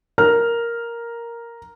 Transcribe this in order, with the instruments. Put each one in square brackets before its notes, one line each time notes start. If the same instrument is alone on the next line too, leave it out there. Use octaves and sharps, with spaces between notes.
[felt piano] A#4 A#5 F6